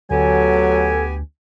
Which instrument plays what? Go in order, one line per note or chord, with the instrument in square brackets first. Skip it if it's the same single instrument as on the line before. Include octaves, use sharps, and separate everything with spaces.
[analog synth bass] D2 [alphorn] F#3 [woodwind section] B3 G4 G#5 [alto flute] A4